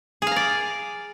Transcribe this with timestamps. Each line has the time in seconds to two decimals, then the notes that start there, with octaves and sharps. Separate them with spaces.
0.22 G#4
0.27 F5
0.32 A#5
0.36 D5